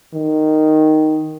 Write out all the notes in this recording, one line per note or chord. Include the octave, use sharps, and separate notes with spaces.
D#3